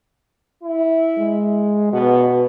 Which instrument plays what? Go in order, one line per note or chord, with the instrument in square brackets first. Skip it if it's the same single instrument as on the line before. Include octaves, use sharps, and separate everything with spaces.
[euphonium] E4
[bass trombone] G#3
[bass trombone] B2 [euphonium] B3